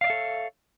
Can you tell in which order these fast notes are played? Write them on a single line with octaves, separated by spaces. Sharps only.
F5 D5 E5 A4 C#5